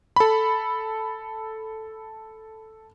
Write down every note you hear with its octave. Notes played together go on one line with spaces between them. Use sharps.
A4 B5